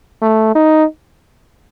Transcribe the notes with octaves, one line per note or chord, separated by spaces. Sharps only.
A3
D#4